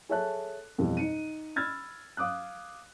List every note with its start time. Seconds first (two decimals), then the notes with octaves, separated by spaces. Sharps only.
0.09 G#4 A4 C#5 E5 A5 F#6
0.78 F2 B2 E3 G3
0.97 D#4 C#7 D#7
1.56 B5 E6 F6 G#6 A6
2.17 F5 D6 D#6 F#6